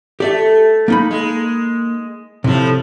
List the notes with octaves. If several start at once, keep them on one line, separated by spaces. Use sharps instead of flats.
A3 G4 D5 E5
A#3 D#4 B5
G#3
A2 C3 F3